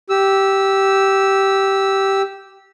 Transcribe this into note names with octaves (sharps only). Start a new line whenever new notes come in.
G4 E6